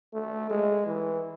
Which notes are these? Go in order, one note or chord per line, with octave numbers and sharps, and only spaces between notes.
A3
G#3
E3